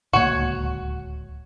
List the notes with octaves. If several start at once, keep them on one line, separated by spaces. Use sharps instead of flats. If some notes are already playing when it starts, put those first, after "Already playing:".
D1 C#2 A#3 F#4 C#5